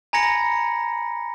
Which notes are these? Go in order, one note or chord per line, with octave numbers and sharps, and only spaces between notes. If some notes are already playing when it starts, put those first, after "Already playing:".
G#5 A#5 B5 G#6 A#6 C#7